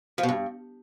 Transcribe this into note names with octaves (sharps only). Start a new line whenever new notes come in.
F3
B2
G2